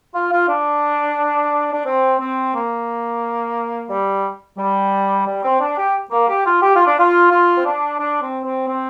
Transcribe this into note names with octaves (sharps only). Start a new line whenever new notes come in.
F4
F4
D4
D4
C4
C4
A#3
G3
G3
G3
C4
D4
G4
A#3
G4
F4
G4
F4
D4
F4
F4
C4
D4
D4
C4
C4
C4